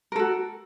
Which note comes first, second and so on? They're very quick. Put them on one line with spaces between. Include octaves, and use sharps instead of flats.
A#4 A4 F#4